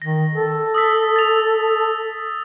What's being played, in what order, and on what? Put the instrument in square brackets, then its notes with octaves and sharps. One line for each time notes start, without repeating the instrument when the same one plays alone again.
[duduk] D#3 [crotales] A#6
[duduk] A4
[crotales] D#6 E6 B6
A6 F7